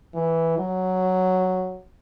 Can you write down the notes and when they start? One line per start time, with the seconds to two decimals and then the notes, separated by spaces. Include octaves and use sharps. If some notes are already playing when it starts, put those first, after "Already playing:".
0.14 E3
0.58 F#3